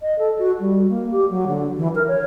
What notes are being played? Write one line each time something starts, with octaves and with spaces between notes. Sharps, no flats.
D#5
A4
F#4
G3
A#3
G4
F#3
D3
E3
A#4
C#5